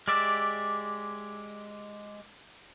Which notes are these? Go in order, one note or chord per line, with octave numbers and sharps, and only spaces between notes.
G#3 G4 D5 E5